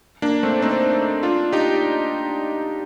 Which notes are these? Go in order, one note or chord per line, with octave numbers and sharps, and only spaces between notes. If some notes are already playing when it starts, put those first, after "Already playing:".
A#3 D4
A3 C4
C4 D#4
D4 F4
D#4 G4